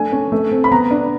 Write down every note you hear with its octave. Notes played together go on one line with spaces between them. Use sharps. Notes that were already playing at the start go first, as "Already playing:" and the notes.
Already playing: A3 D4 G#5
C#4
A3
C4
B5
B3 A#5
D4